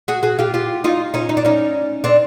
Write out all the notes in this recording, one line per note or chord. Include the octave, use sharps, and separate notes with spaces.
F#4 G#4
F#4 G#4
F4 G4
F4 G4
D#4 F4
C#4 D#4
D#4
D4
C#4 D#4
C4 D4